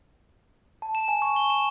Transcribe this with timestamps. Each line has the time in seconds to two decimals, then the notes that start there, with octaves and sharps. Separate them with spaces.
0.82 A5
0.95 E7
1.08 G#5
1.22 C#6
1.36 G7
1.50 E7